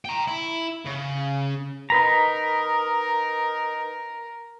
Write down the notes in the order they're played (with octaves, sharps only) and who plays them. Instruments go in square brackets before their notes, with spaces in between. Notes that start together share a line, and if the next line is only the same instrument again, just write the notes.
[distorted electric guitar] G5 A#5
E4
C#3
[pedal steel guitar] D#4 B4 A#5 [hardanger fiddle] A#4